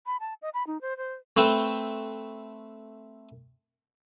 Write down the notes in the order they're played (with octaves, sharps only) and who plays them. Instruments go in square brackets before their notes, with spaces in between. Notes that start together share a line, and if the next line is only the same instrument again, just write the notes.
[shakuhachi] B5
A5
D#5
B5
D#4
C5
C5
[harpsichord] A3 C4 B4 E5 G5